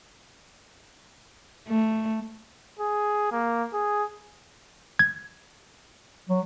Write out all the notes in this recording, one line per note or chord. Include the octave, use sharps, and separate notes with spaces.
A3
G#4
A#3
G#4
G#6
F#3